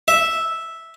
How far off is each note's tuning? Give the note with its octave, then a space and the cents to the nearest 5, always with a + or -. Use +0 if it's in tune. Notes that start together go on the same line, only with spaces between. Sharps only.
E5 -5